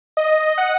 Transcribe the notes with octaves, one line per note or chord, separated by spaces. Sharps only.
D#5
F#5